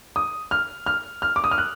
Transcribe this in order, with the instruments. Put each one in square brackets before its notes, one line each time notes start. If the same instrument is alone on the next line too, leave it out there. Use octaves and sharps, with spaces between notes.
[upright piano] D#6
F6
F6
F6
D6
D#6
F6
F#6